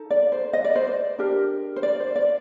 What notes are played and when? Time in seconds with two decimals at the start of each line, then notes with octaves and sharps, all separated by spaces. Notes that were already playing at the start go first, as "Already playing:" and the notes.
Already playing: D#4 A4
0.10 D5
0.32 C5
0.53 D#5
0.64 D5
0.76 C5
0.87 D5
1.18 D4 G4 A#4
1.76 C5
1.83 D5
2.00 C5
2.16 D5